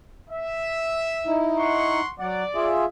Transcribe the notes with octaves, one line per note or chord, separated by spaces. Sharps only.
E5
D#4 E4
F#5 C6 C#6
F#3 D5 F#5
F4 G#4 E5